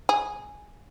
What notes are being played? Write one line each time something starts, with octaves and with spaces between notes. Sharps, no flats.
G#4